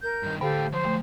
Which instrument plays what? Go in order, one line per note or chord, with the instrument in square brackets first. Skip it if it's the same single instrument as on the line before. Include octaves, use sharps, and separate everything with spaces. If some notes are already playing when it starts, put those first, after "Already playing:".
[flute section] A#4 G6
[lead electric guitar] G2 D#3
[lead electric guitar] A2 G5 [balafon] D3 [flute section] G4 A4 F5
[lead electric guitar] F3 F#3 [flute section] C5
[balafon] A3